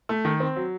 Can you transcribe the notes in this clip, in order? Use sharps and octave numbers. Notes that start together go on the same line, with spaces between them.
A3
D#3
C4
F#3